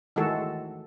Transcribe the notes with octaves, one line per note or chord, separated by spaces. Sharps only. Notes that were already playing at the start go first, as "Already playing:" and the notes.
D#3 E3 G#3 A3 F#4 A4